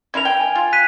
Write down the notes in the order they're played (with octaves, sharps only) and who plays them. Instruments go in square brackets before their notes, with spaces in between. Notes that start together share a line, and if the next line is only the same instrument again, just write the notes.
[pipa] C#3 E4 A#4 [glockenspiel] G#6 F7
[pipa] G5
[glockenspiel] G#5
[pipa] F4
[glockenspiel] F#6 B6 D#7